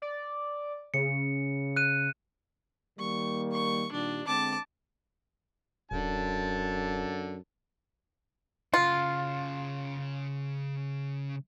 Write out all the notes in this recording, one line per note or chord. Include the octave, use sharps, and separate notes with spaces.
D5
C#3 C#7
F#6 D#7
D#3 G3 A#3 C#6
C#6
A#2 D#3 G3 D4
D3 G#3 C4 A5 D6
D#1 F#2 D3 A5
C#3 F4 F#5